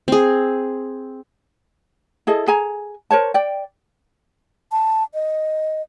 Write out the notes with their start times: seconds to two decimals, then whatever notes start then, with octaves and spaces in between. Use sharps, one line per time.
0.08 C4 G#4
2.27 E4 G#4 A4 D#5
2.47 G#4 G#5 A#5
3.11 A#4 C5 C#5 A5
3.34 D5 G5
4.72 A5
5.14 D#5